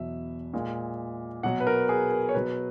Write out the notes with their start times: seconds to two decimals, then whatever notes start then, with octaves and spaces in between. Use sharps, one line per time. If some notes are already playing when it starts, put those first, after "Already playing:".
Already playing: E2 B2 F#3 E5
0.54 A#2 G#3
1.43 B2 F#3 F#5
1.60 B4
1.67 A#4
1.89 G#4
2.11 A#4
2.29 C#5
2.35 B2 F#3 B4